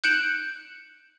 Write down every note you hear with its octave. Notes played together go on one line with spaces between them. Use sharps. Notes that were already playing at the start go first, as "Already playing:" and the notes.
F#6 G6 C#7 D7 E7 F#7